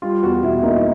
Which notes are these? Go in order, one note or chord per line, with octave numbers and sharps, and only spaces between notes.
G3 F4
E2 F#4
B2 E4
A#3 D#4
E4